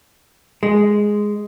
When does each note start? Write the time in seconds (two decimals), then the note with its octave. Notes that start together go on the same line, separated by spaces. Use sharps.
0.63 G#3